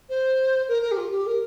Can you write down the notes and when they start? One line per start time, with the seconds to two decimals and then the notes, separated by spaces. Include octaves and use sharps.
0.09 C5
0.68 A#4
0.82 A#4
0.91 G4
0.97 F4
1.11 G4
1.26 A#4